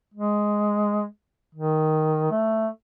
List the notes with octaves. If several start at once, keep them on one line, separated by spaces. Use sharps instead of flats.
G#3
D#3
A3